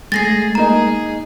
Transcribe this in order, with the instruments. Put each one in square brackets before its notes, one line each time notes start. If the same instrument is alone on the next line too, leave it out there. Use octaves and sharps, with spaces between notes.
[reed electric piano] G#3 A3 [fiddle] G#4 [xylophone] A6 A#6 C7
[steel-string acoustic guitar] A#3 D#4 D#5 [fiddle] G#4 [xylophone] A#5